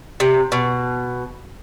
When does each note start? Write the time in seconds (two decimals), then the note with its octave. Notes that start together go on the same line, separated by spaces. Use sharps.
0.20 C3
0.52 B2